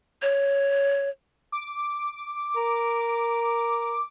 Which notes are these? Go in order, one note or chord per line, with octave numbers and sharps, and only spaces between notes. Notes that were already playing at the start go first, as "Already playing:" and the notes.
C#5
D6
A#4